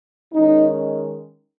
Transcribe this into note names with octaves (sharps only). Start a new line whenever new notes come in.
D#3 G#3 C#4 D#4